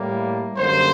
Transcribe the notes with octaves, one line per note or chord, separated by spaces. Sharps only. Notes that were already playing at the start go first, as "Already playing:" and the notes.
Already playing: A2 G3 A#3
F#2 D3 G3 A#3 C5